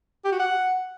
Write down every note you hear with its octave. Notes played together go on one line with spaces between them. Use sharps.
G4
F#4
F#5